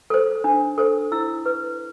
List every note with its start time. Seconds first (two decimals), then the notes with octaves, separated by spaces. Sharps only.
0.10 A4 C5
0.44 D4
0.78 A4 C5
1.12 E4 E6
1.46 B4